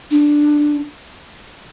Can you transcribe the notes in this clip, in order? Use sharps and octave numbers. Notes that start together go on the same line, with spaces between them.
D4